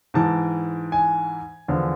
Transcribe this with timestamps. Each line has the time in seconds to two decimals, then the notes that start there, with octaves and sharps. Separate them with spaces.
0.14 G#2 E3 A5
0.92 G#5
1.68 E2 D3 F3